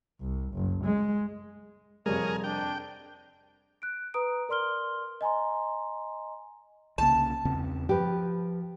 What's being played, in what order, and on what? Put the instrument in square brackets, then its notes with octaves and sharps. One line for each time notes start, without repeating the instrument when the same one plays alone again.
[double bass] C2
F#1
G#3
[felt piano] F2 C3 G3 [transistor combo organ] G#4 A#4 [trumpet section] C#5 F5
[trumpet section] D4 [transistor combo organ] G5
[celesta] F#6 D7
B4 A#5 D#6 D7
A#4 D5 C6 F6 G7
D#5 G#5 A#5 C6
[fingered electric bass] C2 C#3 A#3 [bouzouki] A5
[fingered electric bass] E2 C#3 C4
[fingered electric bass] F3 [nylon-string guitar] G4 B4